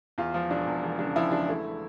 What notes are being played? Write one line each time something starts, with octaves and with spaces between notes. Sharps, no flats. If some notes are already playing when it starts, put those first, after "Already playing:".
E2 F4
F3
E1 D4
E2
E1
C#3 D4
F3 E4
E1 D4
A3 E4